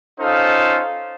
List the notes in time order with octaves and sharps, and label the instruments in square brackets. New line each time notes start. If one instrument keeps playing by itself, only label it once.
[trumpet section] C#4 D#4 F4 A4 C5 F5